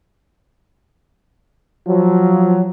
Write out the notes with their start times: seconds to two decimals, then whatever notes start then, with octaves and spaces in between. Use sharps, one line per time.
1.87 F3 F#3